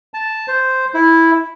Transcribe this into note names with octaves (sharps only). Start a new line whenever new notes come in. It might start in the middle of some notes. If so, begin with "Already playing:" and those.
A5
C5
E4